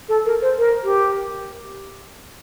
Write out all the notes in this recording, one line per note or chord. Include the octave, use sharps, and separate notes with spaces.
A4
A#4
C5
A#4
G4